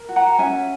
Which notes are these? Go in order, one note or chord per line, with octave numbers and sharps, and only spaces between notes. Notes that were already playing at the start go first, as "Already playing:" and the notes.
Already playing: A#4
F#4
F#5 A#5
C#4 E5 G#5